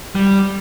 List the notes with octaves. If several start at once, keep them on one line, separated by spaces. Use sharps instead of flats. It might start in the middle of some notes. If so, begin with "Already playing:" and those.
G3